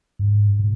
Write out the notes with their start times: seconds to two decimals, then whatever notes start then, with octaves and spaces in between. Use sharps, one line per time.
0.19 G#2
0.59 A#2